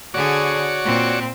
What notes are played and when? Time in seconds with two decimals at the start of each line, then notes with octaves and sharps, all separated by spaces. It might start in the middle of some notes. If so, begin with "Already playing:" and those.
0.14 D3 F#4 G#4 C#5 D5
0.85 A#2 C4